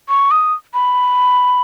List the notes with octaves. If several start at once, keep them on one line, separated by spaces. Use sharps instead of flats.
C#6
D#6
B5